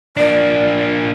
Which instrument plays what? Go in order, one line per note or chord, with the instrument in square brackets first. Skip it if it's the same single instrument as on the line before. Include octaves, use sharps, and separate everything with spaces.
[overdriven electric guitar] A#3 D4 [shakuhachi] D5